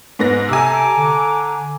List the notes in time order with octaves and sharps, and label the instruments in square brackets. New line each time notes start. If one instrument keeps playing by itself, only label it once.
[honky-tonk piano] G#2 B3 A#6
[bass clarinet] C3 [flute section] A4 A#5 D6 [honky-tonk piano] G#5 E6
[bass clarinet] D3